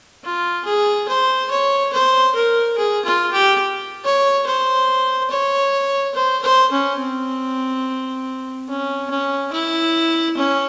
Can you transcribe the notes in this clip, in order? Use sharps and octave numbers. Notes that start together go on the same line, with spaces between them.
F4
G#4
C5
C#5
C5
A#4
G#4
F4
G4
C#5
C5
C#5
C5
C5
C#4
C4
C#4
C#4
E4
C#4